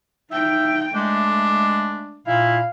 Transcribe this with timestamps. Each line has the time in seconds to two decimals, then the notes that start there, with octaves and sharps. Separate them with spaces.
0.32 D#4 E5 G5
0.94 G#3 A3 D4
2.27 A#2 E4 F5